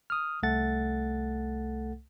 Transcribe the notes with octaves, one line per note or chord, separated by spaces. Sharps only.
D#6 F6
C2 A3 A4 F#5 A6